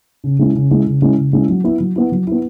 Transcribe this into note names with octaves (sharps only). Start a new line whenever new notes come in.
C#3
G#3 C#4 E4
C#3
G#3 C#4 E4
C#3
G#3 C#4 E4
C#3
G#3 C#4 E4
F#3
B3 E4
F#3
B3 E4
F#3
B3 E4